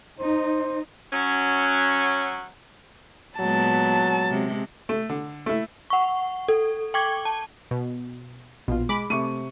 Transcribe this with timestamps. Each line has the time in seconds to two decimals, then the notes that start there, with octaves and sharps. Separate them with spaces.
0.20 D#4 C5
1.12 F#3 C#4
3.40 A#2 F#3 G#3 B3 A5
4.30 C3 G#3
4.89 A3
5.09 D3
5.46 A3 E4
5.90 F#5 C#6
6.48 A4
6.94 G5 C#6 D6 G#6
7.25 A5
7.71 B2
8.68 A#1 B2 F4
8.89 G#3 B5 D6
9.10 C3 A3 C#6 D#7